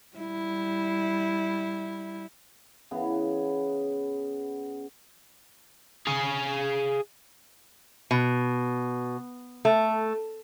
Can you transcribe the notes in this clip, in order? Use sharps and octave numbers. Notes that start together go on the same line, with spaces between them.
G3 E4
C#3 E3 B3
G#4 F5
B2
A3